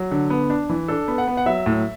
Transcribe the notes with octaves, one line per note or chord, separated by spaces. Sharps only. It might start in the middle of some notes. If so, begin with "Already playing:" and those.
Already playing: F#3
D3
B3
D4
E3
D4 A4
B3
F#5
B3
F#5
F#3 E5
A2